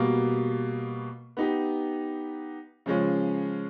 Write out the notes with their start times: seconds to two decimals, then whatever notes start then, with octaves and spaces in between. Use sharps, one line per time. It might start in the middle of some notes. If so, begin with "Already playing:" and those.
Already playing: B2 G3 A#3
1.37 B3 D#4 G4
2.86 C#3 F3 G#3 C#4